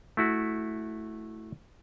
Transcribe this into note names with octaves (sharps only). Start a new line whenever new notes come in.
A3 E4 F#4